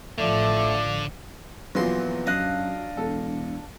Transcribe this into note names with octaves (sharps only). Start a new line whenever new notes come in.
A1 D3 F3 A3 D5 F5 D6
E2 A#2 F3 F#3 C6
F#2 D4 D#5 F5 F#6
E1 A4